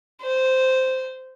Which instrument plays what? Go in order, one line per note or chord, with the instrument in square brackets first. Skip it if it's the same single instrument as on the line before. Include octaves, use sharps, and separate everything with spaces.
[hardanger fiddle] C5